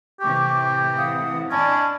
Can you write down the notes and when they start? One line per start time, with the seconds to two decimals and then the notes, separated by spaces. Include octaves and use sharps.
0.21 A2 C3 E3 G4 G5 C#6 D6
0.96 F5 F#5 D#6
1.51 C#4 D4 D5 D#5 G#5 A5 B5